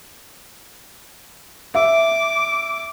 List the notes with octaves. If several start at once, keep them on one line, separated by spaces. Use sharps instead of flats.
E5 D6